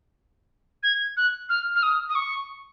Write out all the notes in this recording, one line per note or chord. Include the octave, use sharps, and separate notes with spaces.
G#6
F#6
F6
F6
D#6
D#6
C#6